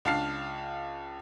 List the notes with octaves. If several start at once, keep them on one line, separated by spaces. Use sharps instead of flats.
C#2 D4 F5 A5 F6 C7